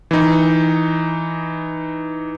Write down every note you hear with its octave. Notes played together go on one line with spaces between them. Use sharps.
E3 D#4